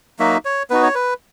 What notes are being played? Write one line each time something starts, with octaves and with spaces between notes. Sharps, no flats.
F#3 A#3 D#4 F#4 E5
C#5
B3 D#4 F#4 B4
C#5
B4